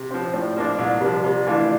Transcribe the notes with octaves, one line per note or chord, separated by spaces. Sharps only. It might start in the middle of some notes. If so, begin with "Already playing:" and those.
Already playing: C3
F3 C4
C5
A2 D5
F3 A#3 D4 D5
C2 D5
C3 F3 A#4
C3 D5
E3 A3 D4 F4